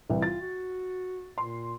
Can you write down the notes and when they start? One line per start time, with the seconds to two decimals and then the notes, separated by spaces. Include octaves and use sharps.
0.10 C2 E3
0.22 F4 A6
0.41 F#4
1.38 A#2 C6